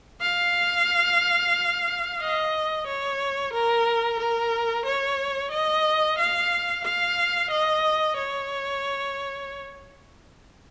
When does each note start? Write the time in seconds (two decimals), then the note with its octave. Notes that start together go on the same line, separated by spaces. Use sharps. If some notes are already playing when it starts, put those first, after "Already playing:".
0.22 F5
2.20 D#5
2.87 C#5
3.53 A#4
4.19 A#4
4.85 C#5
5.51 D#5
6.18 F5
6.84 F5
7.50 D#5
8.17 C#5